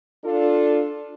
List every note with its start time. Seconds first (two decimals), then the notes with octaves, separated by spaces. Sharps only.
0.24 D4 F4 A4